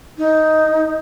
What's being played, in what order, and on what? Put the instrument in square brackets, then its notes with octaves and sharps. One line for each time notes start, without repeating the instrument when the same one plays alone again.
[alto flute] D#4